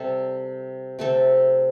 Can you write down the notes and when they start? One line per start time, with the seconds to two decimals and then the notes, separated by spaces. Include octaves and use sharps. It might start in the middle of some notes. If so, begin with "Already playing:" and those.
Already playing: C3 G3 C4 A4
0.99 C3 A3 C4 A4